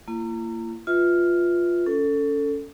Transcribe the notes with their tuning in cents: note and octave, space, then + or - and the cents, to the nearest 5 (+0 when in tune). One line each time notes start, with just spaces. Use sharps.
A#3 -30 E4 +45
F4 +0 B4 +0 E5 -25
C#4 +25 A4 +15